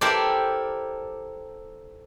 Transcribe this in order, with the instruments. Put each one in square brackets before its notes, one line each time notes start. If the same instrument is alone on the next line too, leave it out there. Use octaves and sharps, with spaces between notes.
[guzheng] E4 G4 A4 A#4 C5 D5